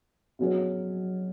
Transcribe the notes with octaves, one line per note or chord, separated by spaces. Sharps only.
B2 F#3 C#4 G#4